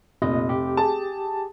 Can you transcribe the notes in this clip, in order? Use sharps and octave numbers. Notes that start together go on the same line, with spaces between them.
F1 A#2 D#5
G4
G#4 A5